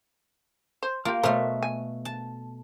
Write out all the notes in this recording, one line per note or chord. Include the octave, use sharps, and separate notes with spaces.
C5
A#3 F4 G4
B2 A3 A#4 C5 C#5
G#5
A5